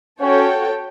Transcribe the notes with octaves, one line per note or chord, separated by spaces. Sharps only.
C#4 F#4 A4 C#5 G5